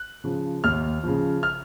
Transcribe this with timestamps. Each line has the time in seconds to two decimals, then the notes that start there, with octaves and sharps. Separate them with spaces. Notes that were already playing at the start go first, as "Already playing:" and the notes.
Already playing: F#6
0.24 C#3 F3
0.64 D#2 F6
1.03 C#3 F3
1.43 F6